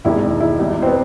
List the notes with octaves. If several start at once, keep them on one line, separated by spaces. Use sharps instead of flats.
E1 D#2 D#3 G#3 E4
E4
E2 B2 G3
C4
B3